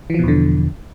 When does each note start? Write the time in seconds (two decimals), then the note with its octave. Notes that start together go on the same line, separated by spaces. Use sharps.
0.10 E3
0.14 F3
0.19 B2
0.23 E2
0.28 D3